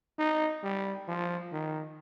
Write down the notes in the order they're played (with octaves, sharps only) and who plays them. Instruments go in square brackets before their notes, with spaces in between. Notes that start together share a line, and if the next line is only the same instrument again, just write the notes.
[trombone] D#4
G3
F3
D#3